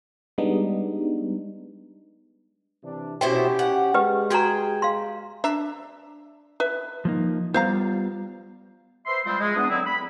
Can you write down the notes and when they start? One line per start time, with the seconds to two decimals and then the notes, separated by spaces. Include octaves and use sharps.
0.38 G3 G#3 B3 D4 D#4
2.83 C3 E3 D4
3.21 B2 C#4 E4 G4 C5 G5
3.59 F#5
3.94 G#3 G4 B4 D#5
4.30 F#4 G#4 G5 A#5
4.82 F5 C6
5.44 D4 E5 A#5
6.60 B4 E5
7.05 F3 A#3 D#4
7.54 G3 B3 F4 C5 F5 A#5
9.06 B4 C5 E5 C6
9.25 F3 G3 G#3 C4 C5
9.40 G#3
9.55 E2 B3 D4 F#5 D#6
9.69 D3 F#3 C4 E4
9.86 B5